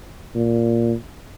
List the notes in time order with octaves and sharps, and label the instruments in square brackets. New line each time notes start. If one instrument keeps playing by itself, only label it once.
[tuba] A#2